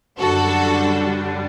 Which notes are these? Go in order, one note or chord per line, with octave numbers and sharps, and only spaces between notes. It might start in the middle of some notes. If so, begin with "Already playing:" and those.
F#2 D3 G3 D4 F#4 A4